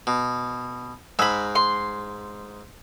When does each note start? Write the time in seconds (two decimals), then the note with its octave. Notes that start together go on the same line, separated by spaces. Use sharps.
0.07 B2
1.19 G#2 G#3 B5 E6
1.55 C6